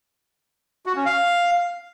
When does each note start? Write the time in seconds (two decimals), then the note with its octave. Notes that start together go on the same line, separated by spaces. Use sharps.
0.86 F#4
0.96 C#4
1.06 F5